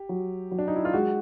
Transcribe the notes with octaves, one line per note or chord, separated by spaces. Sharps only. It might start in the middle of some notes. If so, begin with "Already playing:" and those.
Already playing: G4
F#3
F#3
D4
D#4
E4
F4
G#3 F#4